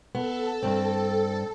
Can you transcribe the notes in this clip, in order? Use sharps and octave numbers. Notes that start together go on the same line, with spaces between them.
B3 A4
G2 C4